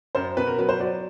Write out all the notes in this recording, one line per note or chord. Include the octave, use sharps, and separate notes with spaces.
F#2 C5
B2 B4
A#4
F#3 B4
C5
F#3 D5